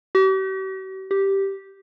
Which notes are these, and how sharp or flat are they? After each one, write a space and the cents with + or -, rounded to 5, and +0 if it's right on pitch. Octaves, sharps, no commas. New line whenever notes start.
G4 -45
G4 -5